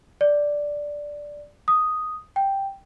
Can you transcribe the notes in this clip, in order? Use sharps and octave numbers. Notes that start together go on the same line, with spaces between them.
D5
D#6
G5